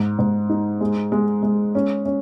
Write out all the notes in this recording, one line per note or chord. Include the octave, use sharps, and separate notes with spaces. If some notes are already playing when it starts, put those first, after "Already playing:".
Already playing: G#2
G#2
D#4
G#3
G#3
G#3
C#4
C#4